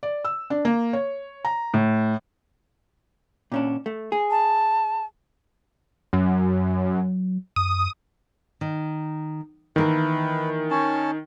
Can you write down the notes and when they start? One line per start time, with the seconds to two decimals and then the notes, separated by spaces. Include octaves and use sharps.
0.03 D5
0.25 E6
0.50 D4
0.65 A#3
0.93 C#5
1.45 A#5
1.74 A2
3.52 A#2 C#4 D4
3.86 A3
4.12 G#4
4.30 A5
6.13 F#2 F#3
7.56 F#2 D#6
8.61 D#3
9.76 D#3 E3 A#3 A#4 B4
10.71 C#4 C#5 A5